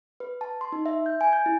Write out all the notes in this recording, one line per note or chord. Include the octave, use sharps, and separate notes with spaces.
B4
A5
C6
D#4
E5
G6
G#5
G6
E4